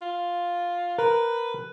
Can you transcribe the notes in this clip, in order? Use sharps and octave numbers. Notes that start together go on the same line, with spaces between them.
F4
A#4 B4